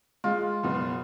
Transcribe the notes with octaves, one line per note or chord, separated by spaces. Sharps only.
G#3 F4
F#1 B2